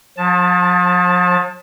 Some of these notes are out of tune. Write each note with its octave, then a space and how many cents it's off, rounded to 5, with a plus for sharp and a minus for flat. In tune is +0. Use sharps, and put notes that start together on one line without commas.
F3 +45 A5 +0